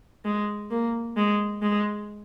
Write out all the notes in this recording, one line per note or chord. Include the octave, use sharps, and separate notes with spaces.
G#3
A#3
G#3
G#3